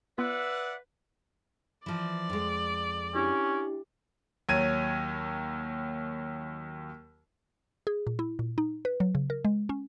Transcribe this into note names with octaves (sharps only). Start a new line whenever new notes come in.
B3 F4 B4 D5 E5 F#5 E6
E3 F3 D5
F2 G#3
C#4 D4 E4 G4
D#2 F#3 G#6 D#7
G#4
A#2
E4
A#2
D#4
B4
F#3
C#3
A#4
G#3
C#4